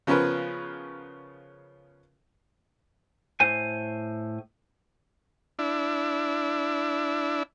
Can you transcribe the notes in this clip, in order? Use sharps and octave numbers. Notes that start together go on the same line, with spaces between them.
C#3 F3 B3 C#4 A#4 B4
A2 C5 G#5
D4 E4